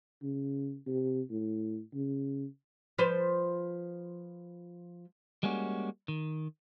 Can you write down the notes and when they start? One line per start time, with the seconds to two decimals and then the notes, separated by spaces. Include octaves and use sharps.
0.22 C#3
0.86 C3
1.30 A2
1.94 C#3
2.98 F3 B4 C5
5.43 G3 G#3 A#3 C#4 F#4
6.08 D#3